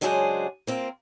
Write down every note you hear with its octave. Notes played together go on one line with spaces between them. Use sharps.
C#3 F#3 G#3 D4 G#4 C5
A#3 C4 F4